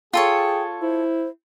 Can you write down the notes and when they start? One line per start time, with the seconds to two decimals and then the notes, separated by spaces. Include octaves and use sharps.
0.13 F4 G#4 A4 C#5 G5
0.82 E4 C5